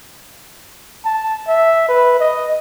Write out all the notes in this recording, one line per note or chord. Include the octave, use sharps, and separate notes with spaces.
A5
E5
B4
D#5